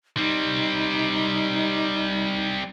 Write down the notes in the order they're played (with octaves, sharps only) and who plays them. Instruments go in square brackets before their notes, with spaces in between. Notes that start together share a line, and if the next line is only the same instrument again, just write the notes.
[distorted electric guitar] G3 C4 [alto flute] D#4